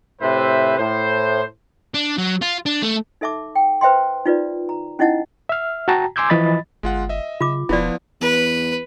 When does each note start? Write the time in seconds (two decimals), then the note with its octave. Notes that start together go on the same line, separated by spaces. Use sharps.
0.22 A2 C3 B4 C5 E5
0.78 A2 C5
1.94 D4
2.18 F#3
2.42 F4
2.66 D4
2.83 A3
3.21 D#4 A4 E5 A5 D6
3.56 G5
3.81 B4 C5 E5 G5 C6
4.26 D#4 F4 B4 D5
4.69 A#5
4.99 C#4 D#4 E4 D#5 F#5 A5
5.49 E5 F6
5.88 F#4 G5 A5 A#5
6.16 G#5 C6 D6 E6 G6 G#6
6.30 E3 F3 D#5 B5 A6
6.83 G1 G#3 F4 F#5
7.09 D#5 E5
7.41 C#3 F4 D6
7.69 E1 F3 B3 E4 F4 D5
8.21 E2 B4